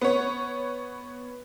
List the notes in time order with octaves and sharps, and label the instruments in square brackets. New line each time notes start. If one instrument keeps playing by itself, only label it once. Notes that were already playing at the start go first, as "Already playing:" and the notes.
[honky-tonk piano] B3 C#5